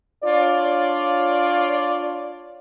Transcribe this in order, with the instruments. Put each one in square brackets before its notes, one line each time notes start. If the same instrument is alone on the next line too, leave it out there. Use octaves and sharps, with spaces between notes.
[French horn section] D4 F4 C#5 D5